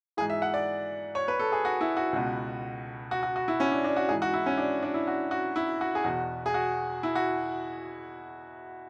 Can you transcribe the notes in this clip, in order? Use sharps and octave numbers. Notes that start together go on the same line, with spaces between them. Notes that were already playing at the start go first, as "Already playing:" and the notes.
G#2 E3 G#4
E5
F#5
D5
C#5
B4
A4
G#4
F#4
E4
F#4
C#2 B2
F#4
F#4
F#4
E4
C#4
D4
D4
F#4
G#2 E3 G#4
F#4
E4
C#4
D4
D4
E4
F#4
F#4
E4
F#4
G#4
E2 B2 F#4
G#4
F#4
E4
F#4